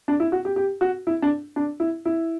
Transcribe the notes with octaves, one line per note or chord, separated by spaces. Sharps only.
D4
E4
F#4
G4
G4
F#4
E4
D4
D4
E4
E4